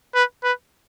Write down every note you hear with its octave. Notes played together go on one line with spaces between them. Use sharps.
B4
B4